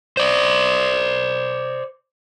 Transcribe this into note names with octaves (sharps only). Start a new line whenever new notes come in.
C5 D5